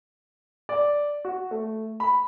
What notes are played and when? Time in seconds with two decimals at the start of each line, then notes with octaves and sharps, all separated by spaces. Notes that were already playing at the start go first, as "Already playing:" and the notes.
0.69 D5
1.25 F#4
1.51 A3
2.00 B5